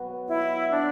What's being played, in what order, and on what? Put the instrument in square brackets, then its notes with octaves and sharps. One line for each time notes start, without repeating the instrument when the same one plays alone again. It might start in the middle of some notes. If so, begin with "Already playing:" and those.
Already playing: [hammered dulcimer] B2 F#3 B3 F#4
[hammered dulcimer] B2 [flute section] E4
[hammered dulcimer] F#3 B3 F#4 [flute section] D4